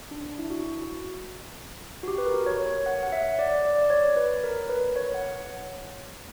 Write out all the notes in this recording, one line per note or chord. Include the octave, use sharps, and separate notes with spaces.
D4
D4
E4
F#4
F#4
G4
B4
A#4
C#5
C#5
F#5
F#5
E5
D5
D5
D5
C#5
B4
A#4
B4
C#5
F#5